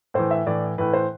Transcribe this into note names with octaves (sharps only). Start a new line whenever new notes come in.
A2 E3 C5
E5
A2 E3 D5
A2 E3 B4
C5